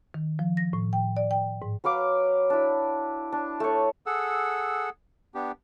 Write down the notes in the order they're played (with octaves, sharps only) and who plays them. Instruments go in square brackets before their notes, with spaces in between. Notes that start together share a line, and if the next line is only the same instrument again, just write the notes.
[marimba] D#3
F3
A#6
A2
G5
D5
G5
G#2
[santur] F#3 B4 F5 D6
D4 E4
D4
A3 C#5
[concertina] G#4 A4 F#5 E6
B3 D4 G4